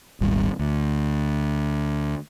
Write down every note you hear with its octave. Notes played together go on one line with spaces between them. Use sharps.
D#1 G#1 G3
D2